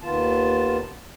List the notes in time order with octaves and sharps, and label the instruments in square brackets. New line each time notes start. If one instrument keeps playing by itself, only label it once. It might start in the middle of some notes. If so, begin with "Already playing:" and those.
[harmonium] D#2 D#3 B3 F4 A5